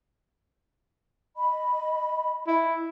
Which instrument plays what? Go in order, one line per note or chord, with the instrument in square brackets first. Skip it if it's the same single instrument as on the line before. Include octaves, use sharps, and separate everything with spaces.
[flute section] D#5 B5
[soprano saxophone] E4